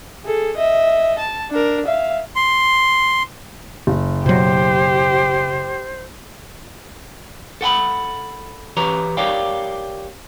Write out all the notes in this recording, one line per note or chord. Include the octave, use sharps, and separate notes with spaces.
G#4 A4
D#5 E5
A5
D4 A#4
E5 F5
C6
F#1
B2 F#3 G4 C5
A4 F#5 G5 B5
E3 G4 B4 C#5 A#5
G4 A#4 C#5 D5 F5 G5